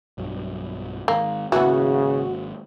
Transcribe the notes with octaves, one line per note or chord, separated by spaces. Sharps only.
B1 G2 F#3
G#2 D#3 A#3
G#1 C#3 E3 F#3 A#3 B3 F#4